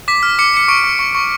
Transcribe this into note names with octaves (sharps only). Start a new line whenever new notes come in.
D6 B6
F6
D6 C#7
D6 C#7
C#6 D7
C#6
C#6
C#6